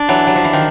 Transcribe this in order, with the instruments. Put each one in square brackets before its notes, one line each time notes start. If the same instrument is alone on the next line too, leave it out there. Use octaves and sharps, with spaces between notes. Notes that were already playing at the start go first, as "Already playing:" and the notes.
Already playing: [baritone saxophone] D4
[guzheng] E3 F#3
F#3
F3
E3
D#3 F3